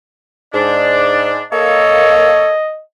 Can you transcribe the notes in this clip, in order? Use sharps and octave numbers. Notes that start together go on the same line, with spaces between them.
G#2 D4 D5
A#3 A4 C#5 D#5